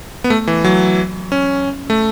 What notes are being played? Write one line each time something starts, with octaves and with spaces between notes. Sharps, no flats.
B3
A3
E3
F#3
C#4
A3